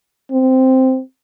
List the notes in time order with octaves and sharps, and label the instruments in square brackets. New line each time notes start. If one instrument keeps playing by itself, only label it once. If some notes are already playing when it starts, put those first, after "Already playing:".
[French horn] C4